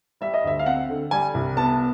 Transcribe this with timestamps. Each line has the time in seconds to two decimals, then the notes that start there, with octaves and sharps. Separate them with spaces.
0.21 G3 E5
0.34 D#5
0.44 D2 E5
0.59 F5
0.66 C4 F#5
0.89 D3
1.11 G3 G#5
1.34 C2
1.57 B3 A5